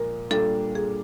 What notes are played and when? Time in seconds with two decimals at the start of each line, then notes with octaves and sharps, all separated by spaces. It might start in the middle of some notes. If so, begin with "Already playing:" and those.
Already playing: A#2 F3 G#3 A#4
0.30 A#2 G3 A#3 D4 F4 A4
0.75 G#4